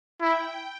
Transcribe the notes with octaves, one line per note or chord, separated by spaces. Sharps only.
E4 G5